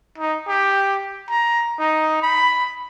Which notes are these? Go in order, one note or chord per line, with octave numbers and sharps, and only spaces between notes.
D#4
G4
A#5
D#4
B5